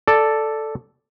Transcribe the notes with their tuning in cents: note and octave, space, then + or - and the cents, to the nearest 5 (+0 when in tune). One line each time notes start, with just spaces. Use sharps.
A4 +0 D5 +5